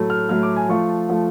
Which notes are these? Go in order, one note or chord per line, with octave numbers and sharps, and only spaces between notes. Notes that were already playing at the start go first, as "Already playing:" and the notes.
Already playing: A2 F#3 A3
F6
A2 F#3 A3 F6
D6
G#5
F3 A3 F4 C#6
F3 A3 F4